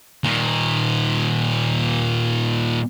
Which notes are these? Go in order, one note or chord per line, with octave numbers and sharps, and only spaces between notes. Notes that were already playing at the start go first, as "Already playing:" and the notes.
A#2 D#3